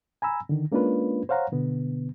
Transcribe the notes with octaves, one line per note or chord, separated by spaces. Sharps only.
G#5 A#5 B5 E6
D3 D#3
G#3 A#3 C#4 D4 F4 B4
C5 C#5 F5 F#5 A#5
B2 D3 B3